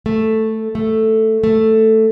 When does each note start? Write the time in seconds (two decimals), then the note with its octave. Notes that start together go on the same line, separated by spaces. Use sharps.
0.06 A3
0.75 A3
1.44 A3